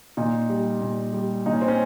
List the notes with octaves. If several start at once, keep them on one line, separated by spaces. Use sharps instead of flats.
A#2 D#4
G3
A#2
G3
A#2 D#4
C#4
C4
C#4